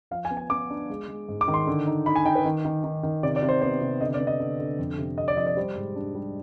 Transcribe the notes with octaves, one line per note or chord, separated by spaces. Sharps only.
F3 F5
G#5
B3
G#5
B3 D6
D4
G#3
G#3
G#2
D6
D#3
C6
D3
D#4
D#4 B5
G#5
D#4 G5
B4
D#3
D#3
D#3
D#3
C3 D5
D5
C3
C5
B3 C5
C3
D3 D#5
D5
B3
D#5
D3
D3
F2
C3
F2 D#5
D5
F3 D#5
D5
G3 C5
G#2
D4
G3